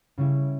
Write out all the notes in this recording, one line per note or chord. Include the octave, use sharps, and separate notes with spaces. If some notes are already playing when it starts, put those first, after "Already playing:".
C#3 G3 C#4 E4